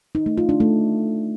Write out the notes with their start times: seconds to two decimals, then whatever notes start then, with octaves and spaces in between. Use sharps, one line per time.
0.15 D#4
0.26 A3
0.38 F4
0.49 D4
0.60 A3